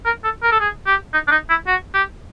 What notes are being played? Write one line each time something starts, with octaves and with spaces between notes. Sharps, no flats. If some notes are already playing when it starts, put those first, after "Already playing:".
A#4
A4
A#4
A4
G#4
G4
D#4
D4
D#4
E4
F#4
G4